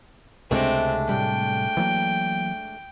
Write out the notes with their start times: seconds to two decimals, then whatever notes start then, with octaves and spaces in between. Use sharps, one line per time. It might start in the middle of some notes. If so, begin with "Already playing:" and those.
0.51 C#2 C3 G#3 A3 C4 D4
1.09 A2 C3 G3 G5
1.77 E3 F#3 A#3